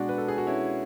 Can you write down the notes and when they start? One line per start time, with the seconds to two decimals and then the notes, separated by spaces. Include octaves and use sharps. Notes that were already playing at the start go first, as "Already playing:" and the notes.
Already playing: B2 G#3 D4 F#4
0.09 B4
0.18 A4
0.28 G#4
0.38 F#4
0.47 C#4 E4